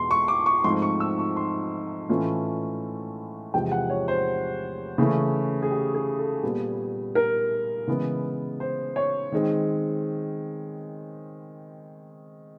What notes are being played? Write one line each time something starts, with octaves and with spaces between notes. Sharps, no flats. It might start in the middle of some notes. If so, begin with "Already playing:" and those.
Already playing: E2 B2 G#3 B3 C6
C#6
D6
C#6
G#2 F3 A3 C4 C6
C#6
E6
C#6
C6
A2 E3 A3 C#4 F4
E2 C3 F3 G#3 G5
F#5
C#5
C5
C#3 E3 A3 C#4
G#4
G4
G#4
A4
A#2 G3 B3
A#4
C#3 E3 G#3 B3
C5
C#5
D#3 G#3 C4